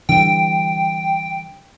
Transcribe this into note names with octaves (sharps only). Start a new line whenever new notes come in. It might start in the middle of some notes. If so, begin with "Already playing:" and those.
D3 E3 G3 G5